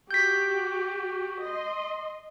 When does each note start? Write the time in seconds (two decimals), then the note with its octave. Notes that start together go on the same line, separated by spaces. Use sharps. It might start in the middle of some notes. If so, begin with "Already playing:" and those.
0.11 F#4 G4 G6 B6
1.43 D#5 C6